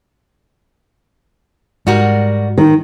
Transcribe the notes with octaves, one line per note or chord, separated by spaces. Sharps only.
G#2 G3 F#4 A#4
D#3